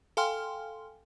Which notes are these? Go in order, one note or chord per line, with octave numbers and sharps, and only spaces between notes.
A4 F5 G5 G#5 C6 F6